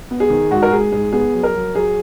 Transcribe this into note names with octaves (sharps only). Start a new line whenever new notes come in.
B3
G#4
D#3
G#2 F#4
A#4
G#2 G#4
G#2 G#4
B3 G#4
F#3
A#4
F#3
F#3 G#4